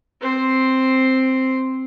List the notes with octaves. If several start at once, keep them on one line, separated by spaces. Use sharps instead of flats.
C4 C5